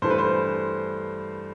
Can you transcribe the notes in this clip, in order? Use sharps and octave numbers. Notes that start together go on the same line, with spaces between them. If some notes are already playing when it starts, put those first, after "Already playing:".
G2 E3 A3 C5
B4
C5